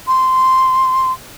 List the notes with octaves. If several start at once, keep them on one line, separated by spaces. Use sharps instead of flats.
C6